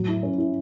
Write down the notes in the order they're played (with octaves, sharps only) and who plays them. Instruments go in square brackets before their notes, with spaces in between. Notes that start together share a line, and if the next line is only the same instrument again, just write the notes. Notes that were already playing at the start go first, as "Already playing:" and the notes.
Already playing: [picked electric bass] A2 [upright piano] F#3
[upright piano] E4
C#4
E4